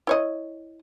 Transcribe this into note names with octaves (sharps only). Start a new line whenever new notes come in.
E4 C#5 D#5